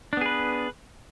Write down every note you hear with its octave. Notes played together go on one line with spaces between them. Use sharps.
B3 D4 G#4 B4